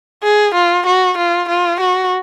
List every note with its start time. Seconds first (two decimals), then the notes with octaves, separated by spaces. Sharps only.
0.23 G#4
0.54 F4
0.86 F#4
1.18 F4
1.49 F4
1.80 F#4